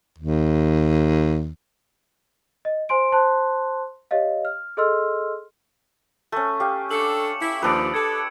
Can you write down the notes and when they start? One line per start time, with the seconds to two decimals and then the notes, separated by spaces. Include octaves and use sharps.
0.18 D#2
2.65 D#5
2.89 C5 G#5 C6 D7
3.12 C5 A5 C6 F#6
4.11 G4 C#5 D#5 F5
4.45 F6
4.77 G#4 A4 D#5 C6 E6 F6
6.32 A3 C#4 C#6
6.60 G4 F5
6.91 D4 A4 D6 C#7 F#7
7.40 E4
7.62 D#2 F3 D4 B4 D#6 E6 D7
7.94 A4 G#6 C#7 E7